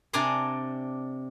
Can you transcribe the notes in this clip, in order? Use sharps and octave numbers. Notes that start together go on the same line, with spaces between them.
C3 D4 D5 G#5 A#5 C6